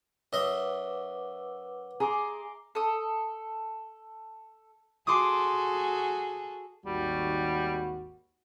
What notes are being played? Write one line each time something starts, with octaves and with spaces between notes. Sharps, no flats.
F#2 B4 D#5 E5 F#5 C6 D6
G#4 A#5 C6 D6
A4 D#6
F#4 G#4 A4 C6 D6 D#6
G#1 D#2 G3 F#4